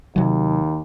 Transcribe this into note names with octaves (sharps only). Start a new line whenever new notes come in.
D#2 C3 F#3